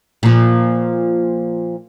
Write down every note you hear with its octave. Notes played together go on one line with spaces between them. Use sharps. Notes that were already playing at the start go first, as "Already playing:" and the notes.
A#2 F3